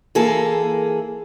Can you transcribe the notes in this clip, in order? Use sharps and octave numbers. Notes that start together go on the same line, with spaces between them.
E3 A#3 G#4 A4